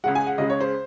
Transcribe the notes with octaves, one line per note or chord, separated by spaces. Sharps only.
C#2 C#3 G#3 F#5
G#5
F#5
C#2 C#3 G#3 D#5
C#5
C5